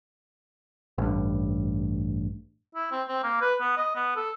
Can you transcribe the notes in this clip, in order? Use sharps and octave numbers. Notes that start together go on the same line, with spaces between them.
A1 G2
E4
C4
C4
A#3
B4
B3
D#5
B3
A4